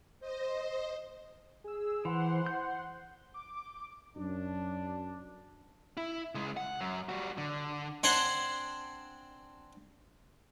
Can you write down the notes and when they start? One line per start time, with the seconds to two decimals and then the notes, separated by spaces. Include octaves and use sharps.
0.20 C5 D#5
1.64 G#4 E6
2.05 E3 C5 F#5 C6
2.46 G6
3.34 D6
4.17 F#2 D4
5.97 E4
6.35 C#3 G#3
6.57 F#5
6.81 F#2
7.09 G3 F#4
7.38 D3
8.03 C4 D4 F#5 G#5 C6